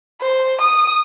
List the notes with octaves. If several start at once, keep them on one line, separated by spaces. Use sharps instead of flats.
C5
D#6